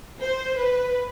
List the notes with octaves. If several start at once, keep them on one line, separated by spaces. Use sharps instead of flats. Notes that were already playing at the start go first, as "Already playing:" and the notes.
C5
B4